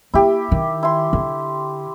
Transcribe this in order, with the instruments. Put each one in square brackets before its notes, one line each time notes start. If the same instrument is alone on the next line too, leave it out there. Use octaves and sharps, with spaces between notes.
[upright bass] A#3 [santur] E4 G4
[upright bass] D#3
[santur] E4 C6
[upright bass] D3